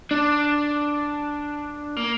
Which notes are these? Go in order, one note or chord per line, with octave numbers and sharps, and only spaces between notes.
D4
A#3